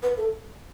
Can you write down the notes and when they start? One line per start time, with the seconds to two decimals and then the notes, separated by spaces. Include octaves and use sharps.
0.03 B4
0.17 A4